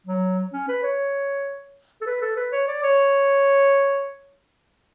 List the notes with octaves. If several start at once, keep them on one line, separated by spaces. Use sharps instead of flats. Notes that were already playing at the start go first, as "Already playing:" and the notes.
F#3
C#4
B4
C#5
A4
B4
A4
B4
C#5
D5
C#5